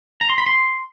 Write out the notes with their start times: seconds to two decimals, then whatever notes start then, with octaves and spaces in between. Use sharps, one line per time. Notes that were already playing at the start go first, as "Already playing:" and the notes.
0.21 A#5
0.30 C6
0.38 B5
0.46 C6